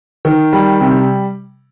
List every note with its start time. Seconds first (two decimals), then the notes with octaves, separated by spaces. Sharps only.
0.25 D#3
0.53 G3
0.80 C3